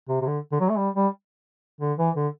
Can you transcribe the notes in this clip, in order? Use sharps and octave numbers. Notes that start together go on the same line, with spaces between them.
C3
C3
D3
D3
F#3
A3
G3
G3
D3
E3
D3